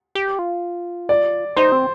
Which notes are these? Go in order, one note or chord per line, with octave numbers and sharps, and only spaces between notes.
G4
F4
D5
D#4 C5
C4